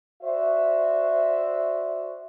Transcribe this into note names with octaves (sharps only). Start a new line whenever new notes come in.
F#4 C5 D5 E5